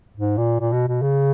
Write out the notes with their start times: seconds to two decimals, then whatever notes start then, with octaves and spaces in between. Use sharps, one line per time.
0.17 G#2
0.37 A#2
0.60 A#2
0.73 B2
0.88 B2
1.02 C#3